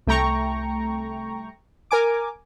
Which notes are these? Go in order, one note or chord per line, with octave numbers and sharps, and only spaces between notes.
C2 A3 G5 A#5 C#6
A#4 G#5 D6